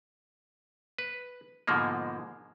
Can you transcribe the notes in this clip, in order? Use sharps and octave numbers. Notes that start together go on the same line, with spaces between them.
B4
G#2 B2 D3 F3 G#3 A#3